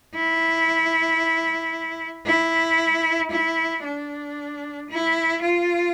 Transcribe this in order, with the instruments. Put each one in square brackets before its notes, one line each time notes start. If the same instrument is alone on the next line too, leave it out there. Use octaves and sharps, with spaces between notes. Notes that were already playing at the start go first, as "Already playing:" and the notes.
[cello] E4
E4
E4
D4
E4
F4